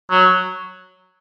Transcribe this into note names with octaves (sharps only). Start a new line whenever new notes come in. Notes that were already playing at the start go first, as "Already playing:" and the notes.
F#3